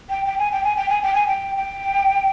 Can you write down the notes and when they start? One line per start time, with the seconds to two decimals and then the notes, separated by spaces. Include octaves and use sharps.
0.10 G5
0.26 G5
0.39 G#5
0.52 G5
0.64 G#5
0.77 G5
0.90 G#5
1.02 G5
1.15 G#5
1.27 G5
1.56 G5